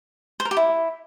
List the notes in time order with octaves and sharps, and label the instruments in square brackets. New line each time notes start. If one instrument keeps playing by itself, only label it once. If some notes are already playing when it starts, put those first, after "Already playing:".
[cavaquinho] C5
A#4
G4
E4